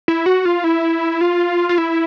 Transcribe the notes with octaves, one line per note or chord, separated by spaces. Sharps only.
E4
F#4
F4
E4
F4
F4
E4